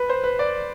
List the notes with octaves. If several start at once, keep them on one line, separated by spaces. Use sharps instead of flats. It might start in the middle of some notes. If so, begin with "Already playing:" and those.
Already playing: B4
C5
B4
D5